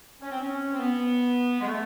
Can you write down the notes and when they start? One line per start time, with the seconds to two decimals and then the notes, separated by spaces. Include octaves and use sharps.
0.21 C#4
0.31 C4
0.40 C#4
0.73 C4
0.79 B3
1.61 G#3
1.67 A3